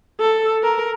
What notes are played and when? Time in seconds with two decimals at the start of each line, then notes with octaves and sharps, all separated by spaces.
0.20 A4
0.63 A#4